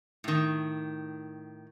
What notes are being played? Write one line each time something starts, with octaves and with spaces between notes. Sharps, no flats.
A2 D#3